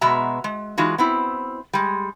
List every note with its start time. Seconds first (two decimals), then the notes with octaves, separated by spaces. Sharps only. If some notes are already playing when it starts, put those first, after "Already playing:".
0.01 B2 G#3 B3 F#4 E5 A#5
0.44 G#3
0.78 E3 G#3 D#4 F4 F#4
0.98 B3 C4 E4
1.73 G3 G#3